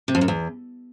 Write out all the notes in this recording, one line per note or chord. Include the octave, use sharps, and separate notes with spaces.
C3
F2
F#2
E2